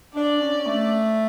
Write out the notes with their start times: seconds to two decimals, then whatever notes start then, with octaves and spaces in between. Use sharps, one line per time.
0.15 D4 D5
0.41 C#4
0.67 A3